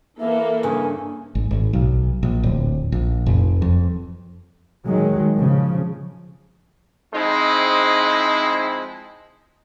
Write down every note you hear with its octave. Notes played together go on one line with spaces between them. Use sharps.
E3 A#3 A4 E5
G2 C#3 G#5
G#1
G#1
B1
A#1
D1
A#1
F1
F2
D#3 F#3 G#3
C#3 F3
F3 G#3 C4 D#4 E4 G#4